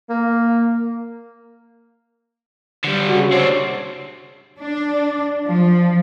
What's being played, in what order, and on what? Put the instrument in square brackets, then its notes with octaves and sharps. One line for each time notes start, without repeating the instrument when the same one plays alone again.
[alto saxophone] A#3
[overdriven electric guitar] D3 G3
[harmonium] C#3 F#4
[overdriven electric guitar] C4 D4 [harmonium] C#5
[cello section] D4
F3